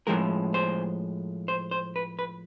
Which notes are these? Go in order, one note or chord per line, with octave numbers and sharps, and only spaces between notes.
A2 F3 G#3 A#4
C5
C5
C5
B4
B4